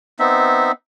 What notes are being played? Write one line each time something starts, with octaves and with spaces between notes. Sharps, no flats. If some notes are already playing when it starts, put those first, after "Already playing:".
B3 C4 D#4 E5